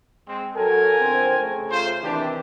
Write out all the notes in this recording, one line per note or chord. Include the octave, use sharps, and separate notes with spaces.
G#3 C4
F#3 A4 A#4 G#5
F2 D3 C4
C#3 A3
F4 C5
C3 D#3 E3 D4 G4